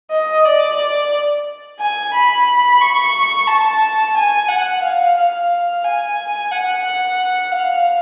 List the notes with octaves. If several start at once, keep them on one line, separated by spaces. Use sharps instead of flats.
D#5
D5
G#5
B5
C#6
A5
G#5
F#5
F5
F5
G#5
F#5
F5